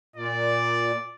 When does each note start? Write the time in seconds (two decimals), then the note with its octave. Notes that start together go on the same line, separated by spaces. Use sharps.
0.16 A#2 D5